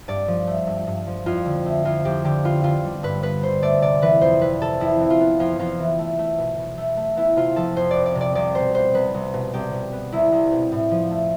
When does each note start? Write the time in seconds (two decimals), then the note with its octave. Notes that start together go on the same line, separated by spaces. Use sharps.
0.08 G2 D5
0.28 F3
0.47 A3
0.67 G2
0.87 G2
1.07 F3
1.26 F2 F4
1.46 D3
1.66 A3
1.85 F2 F4
2.05 F2 G4
2.24 D3 G4
2.44 B3 F4
2.64 D3 F4
2.83 G3
3.03 G2 B4
3.23 B3 B4
3.43 D3 C5
3.62 A3 D5
3.82 C3 D5
4.02 E3 B4
4.21 F2 C5
4.41 A3 B4
4.61 C3 A4
4.80 F2 E4
5.00 E3
5.10 F4
5.20 B3
5.39 F2 F4
5.59 F2 F4
5.79 E3
5.99 A3
6.19 A3
6.38 B2
6.58 B2
6.77 A3
6.97 A3
7.17 B3 E4
7.36 C3 F4
7.56 F3 A4
7.76 F2 C5
7.91 D5
7.96 B3
8.06 D5
8.15 C3
8.21 D5
8.35 C2 D5
8.55 B2 C5
8.74 B3 C5
8.94 C2 B4
9.14 C2
9.34 B2
9.53 C2 G4
9.73 B2
9.93 B3
10.12 C2 E4
10.32 C2
10.52 B2
10.72 A2
10.91 F3
11.11 A3